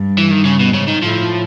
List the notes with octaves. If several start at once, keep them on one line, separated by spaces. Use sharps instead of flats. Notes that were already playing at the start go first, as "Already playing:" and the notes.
Already playing: G2
E3
D#3
C#3
B2
G#2 C#3
D#3
A2 F3